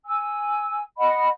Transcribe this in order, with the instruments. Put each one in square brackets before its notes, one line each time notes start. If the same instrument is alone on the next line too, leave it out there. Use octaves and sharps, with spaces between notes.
[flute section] G#5 E6
D#5 F#5 B5